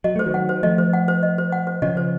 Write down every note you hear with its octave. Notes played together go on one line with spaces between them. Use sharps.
F#3 D#5
A3 C5
D#3 F#3
F#5
C5
F3 A3 D#5
C5
F#5
C5
D#5
C5
F#5
C5
C#3 F3 D#5
C5